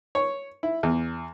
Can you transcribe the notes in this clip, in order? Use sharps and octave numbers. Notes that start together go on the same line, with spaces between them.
C#5
E4
E2